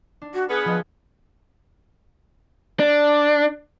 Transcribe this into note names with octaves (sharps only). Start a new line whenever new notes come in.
D4
F#4
B3 G#4 F6 F#6 B6
F3 D#5 F#6
D4